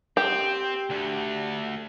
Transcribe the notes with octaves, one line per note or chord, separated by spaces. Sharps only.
C4 G4
D2 D3